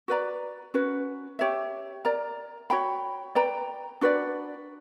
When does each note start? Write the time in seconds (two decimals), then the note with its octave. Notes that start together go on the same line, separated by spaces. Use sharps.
0.08 F#4 B4 D5 A#5
0.74 C#4 F#4 B4
1.39 G4 C#5 E5
2.05 A#4 D5 A#5
2.70 F#4 C#5 G5 B5
3.35 B4 D5 G5 A#5
4.01 D4 F#4 B4 D5